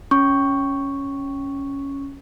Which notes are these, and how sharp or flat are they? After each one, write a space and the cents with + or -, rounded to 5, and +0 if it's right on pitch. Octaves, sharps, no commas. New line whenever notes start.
C#4 +0 C#6 +0